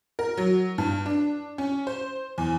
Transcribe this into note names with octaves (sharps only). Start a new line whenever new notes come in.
A#4
F#3
G2
D4
C#4
C5
E2